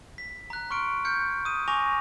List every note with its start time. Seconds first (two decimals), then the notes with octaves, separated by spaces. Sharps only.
0.18 B6
0.50 A#5 F#6
0.70 C6 C#6 F6 C#7 D7
1.05 F6 G6 C#7
1.45 D#6 D#7
1.68 G#5 C#6 D6 A#6 F7